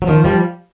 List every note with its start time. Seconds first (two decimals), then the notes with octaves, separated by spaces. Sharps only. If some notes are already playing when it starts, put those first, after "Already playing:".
0.02 F#3
0.07 D#3 F3
0.24 F3 G3